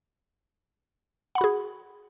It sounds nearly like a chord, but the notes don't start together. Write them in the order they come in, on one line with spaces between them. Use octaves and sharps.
F#5 B5 F#4 G#4